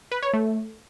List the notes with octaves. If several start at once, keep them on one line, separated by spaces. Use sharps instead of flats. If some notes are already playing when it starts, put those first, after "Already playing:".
B4
C#5
A3